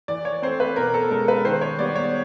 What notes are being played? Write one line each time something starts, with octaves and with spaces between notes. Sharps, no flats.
E3 D5
C#5
A3 C4 C5
B4
B2 A#4
A4
G#3 C#4 A#4
B4
D#3 C5
C#5
G3 B3 D5
C#5